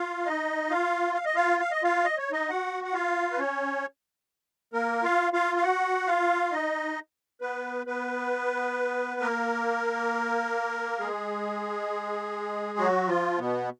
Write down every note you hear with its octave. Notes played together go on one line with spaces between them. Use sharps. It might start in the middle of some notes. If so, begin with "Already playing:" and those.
Already playing: F4 F5
D#4 D#5
F4 F5
F5
D#5
F4 F5
F5
D#5
F4 F5
D#5
C#5
D#4 D#5
F#4 F#5
F#5
F4 F5
B4
C#4 C#5
A#3 A#4
F4 F5
F4 F5
F5
F#4 F#5
F4 F5
D#4 D#5
B3 B4
B3 B4
A#3 A#4
G#3 G#4
F#3 F#4
F3 F4
B2 B3